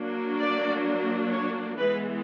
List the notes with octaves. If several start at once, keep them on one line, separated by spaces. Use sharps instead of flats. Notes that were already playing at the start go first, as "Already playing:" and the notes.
Already playing: F#3 A#3 D4
D5
C#5
E3 G#3 B3 B4